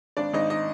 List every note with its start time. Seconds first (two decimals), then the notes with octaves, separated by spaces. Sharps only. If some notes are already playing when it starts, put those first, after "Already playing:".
0.17 G#1 D4 D5
0.34 G#1 D#4 D#5
0.50 D#4 D#5